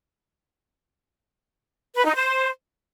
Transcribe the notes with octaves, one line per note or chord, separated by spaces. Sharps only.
B4
D#4
C5